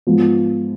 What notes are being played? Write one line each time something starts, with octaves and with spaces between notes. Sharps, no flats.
G#2 F3 B3 F4